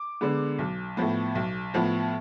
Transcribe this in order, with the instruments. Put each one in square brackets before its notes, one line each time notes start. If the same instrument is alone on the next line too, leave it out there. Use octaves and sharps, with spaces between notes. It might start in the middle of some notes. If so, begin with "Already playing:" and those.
Already playing: [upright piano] D6
D3 G#3 B3
B1
A2 F3 B3
B1
A2 F3 B3